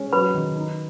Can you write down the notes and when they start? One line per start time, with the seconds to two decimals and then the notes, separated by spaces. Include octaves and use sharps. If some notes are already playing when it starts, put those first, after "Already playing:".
Already playing: G#3 C#4
0.13 F#3 B4 B5
0.34 D#3
0.56 D#4